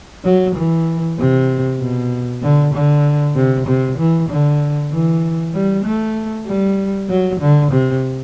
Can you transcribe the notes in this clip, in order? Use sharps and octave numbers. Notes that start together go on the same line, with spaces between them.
F#3
E3
C3
B2
D3
D3
C3
C3
E3
D3
E3
G3
A3
G3
F#3
D3
C3